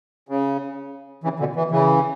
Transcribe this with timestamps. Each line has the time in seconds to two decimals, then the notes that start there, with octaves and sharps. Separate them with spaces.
0.29 C#3
1.24 C#3 E3
1.39 B2 D3
1.56 E3
1.71 C#3 E3